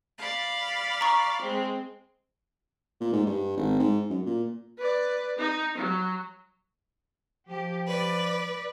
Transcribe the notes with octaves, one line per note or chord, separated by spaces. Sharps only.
D5 F5 B5
A#5 C#6
G#3 C4
A#2
G#2
G2
G#1
G#2
F#2
A#2
B4 D5
D#4
F#3
F3 G4
B4 D5